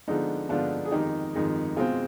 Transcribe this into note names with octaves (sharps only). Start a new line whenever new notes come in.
D3 F3 G#3 B3 D#4
D3 F3 G#3 B3 D4 F4
G#4
F2 D#3 G#3 D#4 G4
F2 D#3 G#3
B2 G#3 C4 F4 G#4